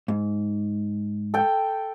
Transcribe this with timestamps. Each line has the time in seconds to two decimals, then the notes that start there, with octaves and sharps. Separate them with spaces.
0.08 G#2
1.34 A4 G5